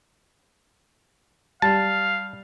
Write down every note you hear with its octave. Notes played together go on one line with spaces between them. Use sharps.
G3 F5 A5